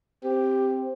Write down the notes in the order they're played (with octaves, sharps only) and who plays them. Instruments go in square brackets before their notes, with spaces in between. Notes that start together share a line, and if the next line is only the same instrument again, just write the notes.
[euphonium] C4 [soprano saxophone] G4